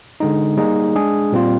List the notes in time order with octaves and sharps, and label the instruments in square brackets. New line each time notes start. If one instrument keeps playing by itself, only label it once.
[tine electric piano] D3 G#3 D#4
G3 A#3 D#4 G#4
G#3 D4 G#4
A#2 G3 C4 F4